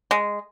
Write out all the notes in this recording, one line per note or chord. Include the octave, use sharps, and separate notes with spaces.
G#3